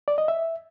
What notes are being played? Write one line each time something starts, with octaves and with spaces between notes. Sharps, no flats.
D5
D#5
E5